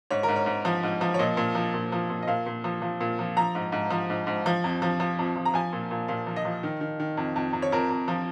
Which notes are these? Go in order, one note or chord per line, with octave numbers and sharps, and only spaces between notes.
G#2 C#5
A#4
G#2
C#5
G#2
F3
G#2
F3
C#5
A#2 D#5
A#2
F3
A#2
F3
A#2
D#5
A#2 F5
A#2
F3
F3
A#2
F3
F3 A#5
G#2
G#2
F3
G#2
G#2
F3
F2
F3
F3
F2
F3
A#5
F3 G#5
A#2
A#2
A#2 F5
F3
D#5
F3
D#3
D#3
D#3
F2
F2
F2
C#5
F2 A#4
F2
F3